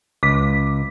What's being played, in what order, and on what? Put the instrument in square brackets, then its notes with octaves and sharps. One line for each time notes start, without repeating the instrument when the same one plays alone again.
[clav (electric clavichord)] C#2 [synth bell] D6 B6